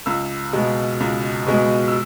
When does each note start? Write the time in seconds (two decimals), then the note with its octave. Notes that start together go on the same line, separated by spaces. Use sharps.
0.06 C#2 E6
0.53 B2 G#3
1.00 C#2
1.47 B2 G#3
1.88 E6